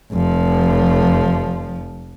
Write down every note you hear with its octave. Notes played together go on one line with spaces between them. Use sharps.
F1 F3